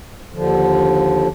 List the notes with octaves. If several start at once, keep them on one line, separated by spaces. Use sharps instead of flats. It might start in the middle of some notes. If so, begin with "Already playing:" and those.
D#2 D3 F3